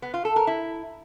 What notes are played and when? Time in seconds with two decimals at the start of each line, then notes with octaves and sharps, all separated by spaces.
0.02 B3
0.14 F4
0.25 A4
0.36 A#4
0.47 E4